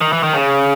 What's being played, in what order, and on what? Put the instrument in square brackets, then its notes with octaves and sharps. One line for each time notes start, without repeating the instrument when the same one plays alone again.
[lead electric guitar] D#3
E3
D#3
C#3